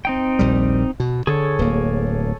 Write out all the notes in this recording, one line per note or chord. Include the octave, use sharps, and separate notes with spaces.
C4 D#4 G5
A#1 D#2 G3
B2
D3 G#4 A4 C#5
D1 A#3